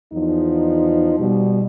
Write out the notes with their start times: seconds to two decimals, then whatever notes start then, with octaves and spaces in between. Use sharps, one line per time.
0.13 E2 F3 D#4
1.19 B2 G3